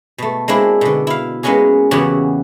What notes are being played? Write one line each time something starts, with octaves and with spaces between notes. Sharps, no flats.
B2 A3
G#3 A#3 C4 D4 E4
B2 D3
E4 F5
G#3 A#3 B3 C#4 F#4 G#4
E2 C#3 E3 F#4 G4 C#5